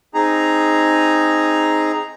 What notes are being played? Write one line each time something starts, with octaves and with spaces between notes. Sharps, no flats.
C4 D#4 G#4 A#5